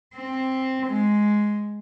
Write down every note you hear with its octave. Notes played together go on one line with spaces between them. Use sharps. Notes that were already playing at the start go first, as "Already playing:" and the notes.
C4
G#3